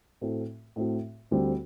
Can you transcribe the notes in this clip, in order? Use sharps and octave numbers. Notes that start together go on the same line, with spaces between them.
A2 A3 C4 F#4
A2 A3 C4 F#4
D2 D3 G3 C4